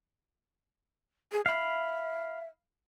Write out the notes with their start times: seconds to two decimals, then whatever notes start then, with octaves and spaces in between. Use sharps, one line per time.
1.32 G#4
1.46 E5 F5 B5